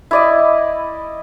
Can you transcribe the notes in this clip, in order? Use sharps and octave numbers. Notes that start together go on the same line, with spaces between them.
E4 D5 D#5